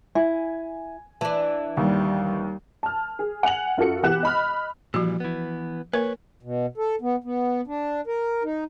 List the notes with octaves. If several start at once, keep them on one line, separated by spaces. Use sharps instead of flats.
E4 G#5
E3 D4 A5
D#2 G3
A5 F6
G#4
F#5 G#5 F7 F#7
F#2 F4 F#4 A4 C#7
B2 E3 G4 F#5 F#6 E7
D#5 B5 F6
A#2 E3 F3 G3 F#4
E3 B3
A#3 A#4 B4 C#5
B2
A4
B3
B3
D4
A#4
D#4